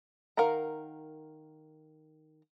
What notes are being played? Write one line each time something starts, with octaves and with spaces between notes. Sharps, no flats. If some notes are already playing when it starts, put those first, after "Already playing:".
D#3 A#4 F5 F#5 A#5